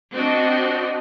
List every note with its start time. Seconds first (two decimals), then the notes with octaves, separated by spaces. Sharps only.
0.13 C4 D4 F#4 D#5